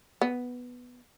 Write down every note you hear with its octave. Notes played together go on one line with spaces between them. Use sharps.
B3